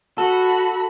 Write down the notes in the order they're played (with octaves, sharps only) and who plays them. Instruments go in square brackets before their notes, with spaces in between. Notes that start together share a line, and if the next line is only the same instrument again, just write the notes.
[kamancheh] F#4 B5 [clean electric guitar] A4